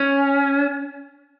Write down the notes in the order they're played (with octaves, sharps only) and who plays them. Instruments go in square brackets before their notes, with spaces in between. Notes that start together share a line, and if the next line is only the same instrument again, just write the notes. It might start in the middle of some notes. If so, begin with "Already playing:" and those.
Already playing: [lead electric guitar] C#4